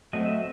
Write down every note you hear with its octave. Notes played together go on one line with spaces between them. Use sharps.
F#3 A3 C4 D#5
E5